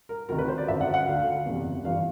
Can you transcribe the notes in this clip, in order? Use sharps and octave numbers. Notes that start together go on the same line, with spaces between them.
A#4
D2 C3 D#3 A#4
B4
C5
D5
G#1 F#2 D3 E5
F#5
F#5
D2 D3 F5
F#1 E2 C3 E3
G1 G2 E3 F5